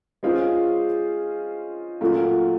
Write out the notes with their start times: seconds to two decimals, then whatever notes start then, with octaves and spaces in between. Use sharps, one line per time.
0.23 G#3 C#4 F4 G#4 C5
2.01 A#2 F#3 A3 C#4 F4